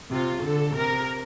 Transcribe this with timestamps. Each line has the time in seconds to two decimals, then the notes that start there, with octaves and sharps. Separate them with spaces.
0.10 C3 F4
0.43 D3 A4
0.75 C3 A#4